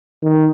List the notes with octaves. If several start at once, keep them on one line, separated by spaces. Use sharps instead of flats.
D#3